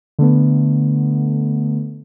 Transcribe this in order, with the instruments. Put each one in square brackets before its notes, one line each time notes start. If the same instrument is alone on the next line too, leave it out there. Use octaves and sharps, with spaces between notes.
[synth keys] D3 A3 B3